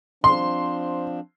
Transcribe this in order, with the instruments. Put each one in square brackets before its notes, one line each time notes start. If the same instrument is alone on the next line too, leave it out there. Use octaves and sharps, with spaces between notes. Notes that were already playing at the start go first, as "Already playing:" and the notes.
[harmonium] F3 C4 D4 [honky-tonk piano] C6